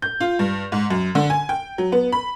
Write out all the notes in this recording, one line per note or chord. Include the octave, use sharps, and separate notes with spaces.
G6
F4
G2
G#2
F#2
D3
G#5
G5
F#3
B3
B5